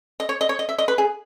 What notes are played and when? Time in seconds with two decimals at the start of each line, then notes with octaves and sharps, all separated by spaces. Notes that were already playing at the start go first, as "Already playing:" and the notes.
0.20 D#5
0.29 C#5
0.41 D#5
0.49 C#5
0.59 D#5
0.69 E5
0.78 D#5
0.88 B4
0.98 G#4